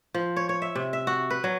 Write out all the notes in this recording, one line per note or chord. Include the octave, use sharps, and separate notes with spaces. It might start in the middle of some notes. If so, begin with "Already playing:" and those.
F3
C#5
C#5
E5
C3
E5
F#4
B4
F#3